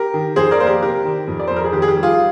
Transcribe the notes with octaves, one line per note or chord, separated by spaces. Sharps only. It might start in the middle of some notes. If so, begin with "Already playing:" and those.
Already playing: G4 A#4
D#3
F2 G#4 C5
A#4 D5
A#3 C5
G4 A#4
C3 G4 A#4
D#3
F2
D5
F2 C5
A#4
G#4
D#3 G4
G#4
G4
G3
F4 G#4